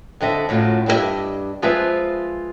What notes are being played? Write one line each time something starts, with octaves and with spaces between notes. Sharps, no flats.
F2 D3 D#5 E5
F#2 A2 F#3 F4
G2 D4 G4 A4 D#5 E5
F3 G#3 F4 B4 C5 E5